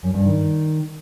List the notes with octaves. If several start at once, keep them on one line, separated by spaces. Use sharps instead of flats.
F#2
G2
D#3